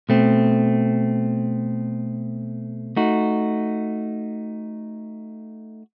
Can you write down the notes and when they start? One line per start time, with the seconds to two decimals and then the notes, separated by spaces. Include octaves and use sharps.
0.09 B2 A3 C4
2.97 A3 D#4 F#4